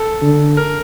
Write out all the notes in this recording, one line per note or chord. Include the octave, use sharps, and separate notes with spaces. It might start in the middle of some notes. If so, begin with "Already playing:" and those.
Already playing: A4
D3
A#4